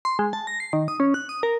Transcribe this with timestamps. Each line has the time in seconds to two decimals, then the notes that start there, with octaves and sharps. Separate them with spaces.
0.05 C6
0.19 G#3
0.33 A5
0.47 A#6
0.60 C7
0.73 D#3
0.88 D#6
1.00 C#4
1.14 F#6
1.29 D#6
1.43 A#4